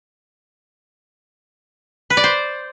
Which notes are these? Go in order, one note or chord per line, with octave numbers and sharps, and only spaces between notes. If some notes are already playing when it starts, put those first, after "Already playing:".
B4
D5
C5